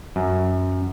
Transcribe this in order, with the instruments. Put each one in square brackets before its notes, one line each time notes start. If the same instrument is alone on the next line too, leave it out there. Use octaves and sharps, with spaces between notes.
[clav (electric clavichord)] F#2